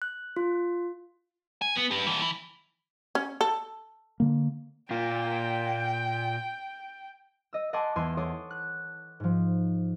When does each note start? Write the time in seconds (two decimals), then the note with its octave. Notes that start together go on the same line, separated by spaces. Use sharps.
0.02 F#6
0.37 F4
1.62 G#5
1.76 B3
1.91 G4 B4
2.07 D#2 E3
2.22 E3
3.15 C#4
3.41 A4
4.20 D3 A#3
4.90 A#2 F4 G5
7.53 D#5 E6
7.73 D#5 F#5 G#5 A5 C6 D6
7.96 E2 G#5 C6 D6 E6 E7
8.17 A4 C#5 F#5 C6 D6 D#6
8.51 F#6
9.20 G#2 F3